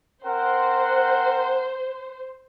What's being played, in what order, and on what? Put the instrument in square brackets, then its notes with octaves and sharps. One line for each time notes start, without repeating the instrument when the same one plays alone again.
[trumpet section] C4 A#4 F#5 [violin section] C5